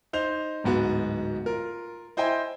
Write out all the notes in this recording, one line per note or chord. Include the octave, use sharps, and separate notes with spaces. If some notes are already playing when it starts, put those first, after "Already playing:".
D#4 C5 G6 F7
D1 G#2 B3 F#4
F4 A#4
E4 C5 D#5 G5 G#5